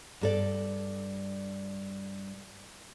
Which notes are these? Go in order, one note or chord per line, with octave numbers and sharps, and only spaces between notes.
G2 A4 D5